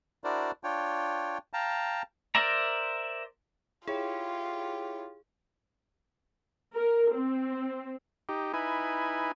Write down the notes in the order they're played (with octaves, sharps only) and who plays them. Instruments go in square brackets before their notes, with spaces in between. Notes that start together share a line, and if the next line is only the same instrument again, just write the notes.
[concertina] D4 E4 F#4 A#4 C5 D5
D4 F4 C#5 G5
F5 G5 A5 A#5
[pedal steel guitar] A#4 C5 D5 E5 A#5
[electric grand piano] E4 C#5 [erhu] F4 [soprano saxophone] G4 [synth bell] G#4
[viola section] A#4
C4
[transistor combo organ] D#4 G4
D#4 E4 B4 G#5